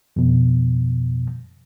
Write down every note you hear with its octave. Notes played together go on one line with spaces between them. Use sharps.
F2 B2